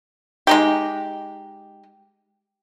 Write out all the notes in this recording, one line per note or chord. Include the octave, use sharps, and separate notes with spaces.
G#3 D#4 G4